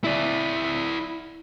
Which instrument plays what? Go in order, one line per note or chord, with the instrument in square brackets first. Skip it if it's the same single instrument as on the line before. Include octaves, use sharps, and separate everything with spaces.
[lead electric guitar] E4 D5